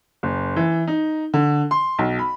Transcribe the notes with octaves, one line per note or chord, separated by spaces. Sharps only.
F#1
E3
D#4
D3
C6
B1
B5